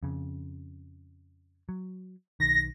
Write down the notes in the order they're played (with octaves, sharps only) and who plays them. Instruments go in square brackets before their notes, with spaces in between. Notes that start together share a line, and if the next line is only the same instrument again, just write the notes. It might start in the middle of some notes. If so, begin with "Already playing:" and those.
[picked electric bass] F2 C#3
F#3
[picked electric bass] B1 D#3 [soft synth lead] A#6